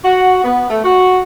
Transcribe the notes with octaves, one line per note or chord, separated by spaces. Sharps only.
F#4
B3
A3
F#4